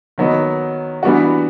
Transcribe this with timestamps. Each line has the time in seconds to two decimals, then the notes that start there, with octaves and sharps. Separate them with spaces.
0.18 D#3 F#3 B3 D#4
1.03 E3 G3 B3 D4 F#4